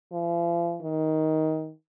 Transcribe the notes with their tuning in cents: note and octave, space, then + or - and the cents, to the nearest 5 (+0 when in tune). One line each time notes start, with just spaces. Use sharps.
F3 -40
D#3 +15